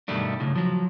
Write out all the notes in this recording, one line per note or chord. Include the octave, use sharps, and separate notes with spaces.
G2 B2 D#3 G3 A3 D4
A2 C#3
F3 F#3